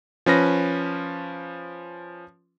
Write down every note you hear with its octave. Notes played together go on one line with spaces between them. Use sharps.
F3 C#4 B4 A#6